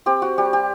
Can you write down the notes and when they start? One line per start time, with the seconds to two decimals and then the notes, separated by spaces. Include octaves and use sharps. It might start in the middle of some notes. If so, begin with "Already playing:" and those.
0.06 C4 G4
0.22 F#4
0.37 G3 G4
0.53 G4